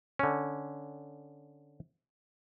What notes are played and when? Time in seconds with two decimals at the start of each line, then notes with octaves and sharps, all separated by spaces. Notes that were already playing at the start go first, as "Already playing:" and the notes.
0.19 D3 C#4